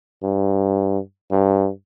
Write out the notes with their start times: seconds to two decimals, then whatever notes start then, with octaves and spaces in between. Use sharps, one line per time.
0.23 G2
1.32 G2